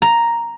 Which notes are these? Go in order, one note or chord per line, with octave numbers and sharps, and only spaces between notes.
A#5